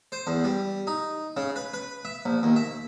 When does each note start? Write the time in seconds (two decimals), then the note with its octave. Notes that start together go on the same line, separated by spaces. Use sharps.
0.12 C5
0.27 E2
0.44 G3
0.87 D#4
1.37 C#3
1.56 B4
1.74 B4
2.05 E5
2.25 A#1
2.43 D#2
2.56 E5